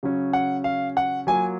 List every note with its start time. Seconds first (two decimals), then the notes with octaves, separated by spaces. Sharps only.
0.03 C#3 F#3 C#4
0.33 F#5
0.64 F5
0.97 F#5
1.27 F#3 A#3 F4 G#5